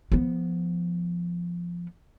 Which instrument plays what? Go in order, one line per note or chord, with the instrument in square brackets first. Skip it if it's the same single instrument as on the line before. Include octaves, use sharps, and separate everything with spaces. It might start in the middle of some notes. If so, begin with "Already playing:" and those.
[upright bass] F3 B3